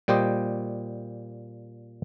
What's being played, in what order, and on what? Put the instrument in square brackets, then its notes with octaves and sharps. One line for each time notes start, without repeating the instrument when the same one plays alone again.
[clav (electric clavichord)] A#2 G3 G4 C5 D#5